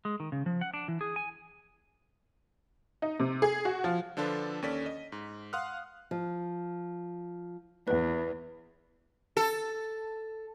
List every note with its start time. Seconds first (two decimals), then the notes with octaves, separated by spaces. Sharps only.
0.05 G#3
0.20 D#3
0.32 C#3
0.46 F3
0.61 F#5
0.74 D4
0.88 E3
1.01 G#4
1.16 G#5
3.02 D#4
3.19 C3
3.42 G#4
3.65 F#4
3.84 F3
4.17 D3 F3 D4 F4 A4 B4
4.62 D#2 C#4 A4 D5 B6
4.86 D#5
5.12 G#2
5.53 F5 F#5 C6 D#6 F6 F#6
6.11 F3
7.88 E2 B4
9.37 A4